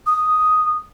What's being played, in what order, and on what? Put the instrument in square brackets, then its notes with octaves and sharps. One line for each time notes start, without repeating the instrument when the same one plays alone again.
[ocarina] D#6